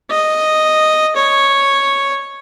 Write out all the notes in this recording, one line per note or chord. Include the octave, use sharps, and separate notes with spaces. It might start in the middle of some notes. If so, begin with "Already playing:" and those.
D#5
C#5